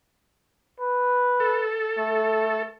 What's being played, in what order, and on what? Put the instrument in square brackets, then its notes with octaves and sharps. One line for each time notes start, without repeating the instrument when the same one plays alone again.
[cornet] B4
[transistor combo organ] A4
[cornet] A3